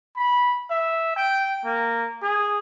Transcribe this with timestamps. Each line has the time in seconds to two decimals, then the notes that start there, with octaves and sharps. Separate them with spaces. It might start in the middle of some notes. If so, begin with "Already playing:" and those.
0.16 B5
0.70 E5
1.16 G5
1.65 A#3
2.22 G#4